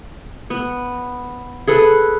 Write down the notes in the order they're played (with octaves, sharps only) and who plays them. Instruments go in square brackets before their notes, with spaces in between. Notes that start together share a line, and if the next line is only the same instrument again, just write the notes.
[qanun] B3
G#4 A4 B4